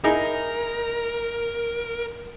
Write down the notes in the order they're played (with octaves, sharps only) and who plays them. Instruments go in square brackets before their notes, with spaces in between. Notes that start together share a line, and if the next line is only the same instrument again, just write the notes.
[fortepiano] D#4 E4 G#4 [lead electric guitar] A#4